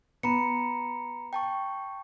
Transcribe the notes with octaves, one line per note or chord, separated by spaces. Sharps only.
B3 A#5 B5 C#7
G5 A5 C#6